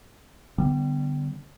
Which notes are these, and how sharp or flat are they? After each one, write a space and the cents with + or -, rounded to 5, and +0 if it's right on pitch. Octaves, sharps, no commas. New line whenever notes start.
D3 +0 G3 -15 B3 +15